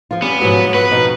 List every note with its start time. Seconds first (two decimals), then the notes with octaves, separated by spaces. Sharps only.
0.11 F3 F4
0.22 G3 B3 C#4
0.41 G#2 B2 F3 F#3
0.74 B3 F#4 B4
0.91 F2 B2 F3 D#4